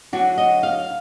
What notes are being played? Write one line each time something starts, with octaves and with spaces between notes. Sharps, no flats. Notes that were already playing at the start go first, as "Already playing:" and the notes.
D3 F#3 D4 F#4
D#5
F5